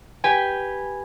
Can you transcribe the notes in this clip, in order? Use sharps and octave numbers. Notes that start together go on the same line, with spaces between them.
G4 B4 G5 G#5